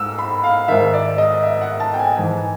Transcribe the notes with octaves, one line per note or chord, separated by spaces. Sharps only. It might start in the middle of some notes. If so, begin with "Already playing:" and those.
Already playing: G#2 E6
B5
F5
G#2 D#3 E5
D5
D#5
E5
F#5
A5
G5
G#5
G#2 E3 G#5